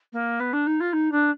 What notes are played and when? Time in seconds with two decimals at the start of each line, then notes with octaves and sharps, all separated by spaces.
0.13 A#3
0.40 B3
0.53 D4
0.66 D#4
0.80 F4
0.93 D#4
1.11 D4